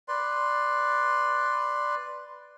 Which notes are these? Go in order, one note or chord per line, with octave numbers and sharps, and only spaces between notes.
B4 D5 C6